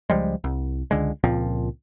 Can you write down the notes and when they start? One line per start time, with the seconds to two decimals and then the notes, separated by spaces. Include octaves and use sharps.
0.10 C#2 F3 G3 G#3
0.44 C2
0.91 C#2 D3 G#3
1.24 C#2 A#2 F3 C4